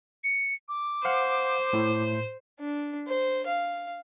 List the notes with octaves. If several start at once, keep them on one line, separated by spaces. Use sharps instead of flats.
C#7
D6
C5 F5 F#5
A2 E4
D4
C5
F5